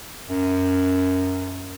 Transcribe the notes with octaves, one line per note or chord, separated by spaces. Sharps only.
F#2